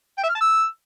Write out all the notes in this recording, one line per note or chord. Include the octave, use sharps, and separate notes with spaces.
G5
E5
F6
A5
E6